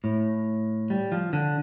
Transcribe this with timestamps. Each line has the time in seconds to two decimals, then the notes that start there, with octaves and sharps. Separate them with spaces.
0.04 A2
0.90 G3
1.12 F3
1.33 D3